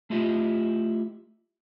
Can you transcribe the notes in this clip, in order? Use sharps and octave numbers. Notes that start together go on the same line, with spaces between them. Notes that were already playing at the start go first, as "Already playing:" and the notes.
A3 E4 F4 G4 D#5 E5